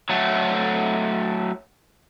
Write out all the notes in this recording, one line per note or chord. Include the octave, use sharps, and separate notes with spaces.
F#3 A3